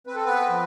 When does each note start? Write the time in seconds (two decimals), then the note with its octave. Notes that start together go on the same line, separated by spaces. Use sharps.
0.07 C4 B4
0.16 A4
0.25 B3 B4
0.49 F3